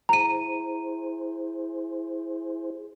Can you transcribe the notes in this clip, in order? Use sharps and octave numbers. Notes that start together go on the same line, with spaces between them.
E4 G#4 C5 A#5 D#7